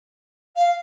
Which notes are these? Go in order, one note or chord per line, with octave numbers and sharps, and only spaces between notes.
F5